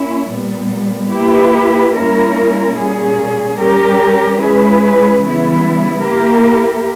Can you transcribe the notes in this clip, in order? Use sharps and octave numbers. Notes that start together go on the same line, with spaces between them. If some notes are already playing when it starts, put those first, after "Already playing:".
Already playing: A#3 C#4 E4
A#2 G3 B3
A#3 E4 G4 B4
G3 A#3 C#4 E4 A#4
A#2 G3 C#4 G#4
G3 C#4 G4 A#4
G#3 C#4 E4 G#4 B4
C#3 E3 G3 B3 E4
A#3 E4 G4 A#4